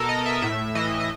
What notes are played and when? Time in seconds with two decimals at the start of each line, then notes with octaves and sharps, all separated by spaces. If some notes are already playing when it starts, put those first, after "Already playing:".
Already playing: B2 A4 A#4
0.09 D#5
0.26 E5
0.42 A2 E5
0.75 E3 D#5
1.00 D#5